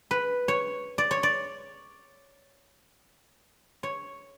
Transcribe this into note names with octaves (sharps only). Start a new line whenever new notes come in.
B4
C#5
D5
C#5
D5
C#5